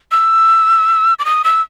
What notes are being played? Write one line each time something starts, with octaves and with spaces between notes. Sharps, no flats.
E6
D6
D#6
E6